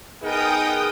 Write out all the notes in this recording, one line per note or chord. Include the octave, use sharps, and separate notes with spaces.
B3 D#4 G#4 A#4 G5 D#6